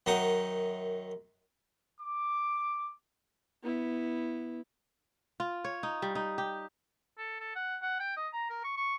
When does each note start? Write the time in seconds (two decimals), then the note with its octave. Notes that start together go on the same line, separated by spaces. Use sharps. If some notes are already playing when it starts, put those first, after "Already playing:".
0.06 F#2 D#3 D#4 F#5 D#6
2.01 D6
3.63 B3 E4
5.40 F4
5.65 C#5
5.83 D#4
6.02 G3
6.15 D#4
6.38 G4
7.18 A4
7.40 A4
7.55 F#5
7.82 F#5
8.00 G5
8.17 D#5
8.33 A#5
8.50 A#4
8.64 C#6
8.77 C#6